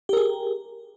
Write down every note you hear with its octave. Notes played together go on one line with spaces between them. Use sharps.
G4 G#4 A#4